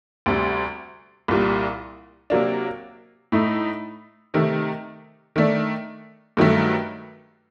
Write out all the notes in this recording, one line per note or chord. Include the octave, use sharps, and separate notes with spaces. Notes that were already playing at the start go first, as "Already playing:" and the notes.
D2 C3 G3
C2 A#2 G3
C3 F#3 A#3 D4
A2 A3 D#4
C3 D#3 A3
D#3 A3 D4
G2 D#3 F#3 A3